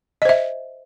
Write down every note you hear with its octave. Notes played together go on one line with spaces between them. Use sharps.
C5 D#5 E5